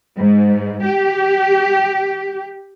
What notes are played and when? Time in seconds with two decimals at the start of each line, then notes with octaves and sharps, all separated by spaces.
0.17 G#2
0.84 G4